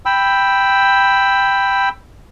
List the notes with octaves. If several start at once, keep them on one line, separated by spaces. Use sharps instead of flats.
G5 B5 E6